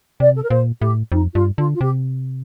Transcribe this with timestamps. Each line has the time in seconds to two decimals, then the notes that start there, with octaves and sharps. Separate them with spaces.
0.20 C3 D5
0.36 A4
0.43 A#4
0.50 A#2 C5
0.81 A2 G4
1.12 F2 D#4
1.35 G2 F4
1.58 D3 F4
1.75 F4
1.81 C3 G4